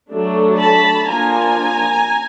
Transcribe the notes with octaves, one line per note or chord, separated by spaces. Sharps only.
F#3 A3 D4
A5 B5
F3 A#3 D4 G#5 A#5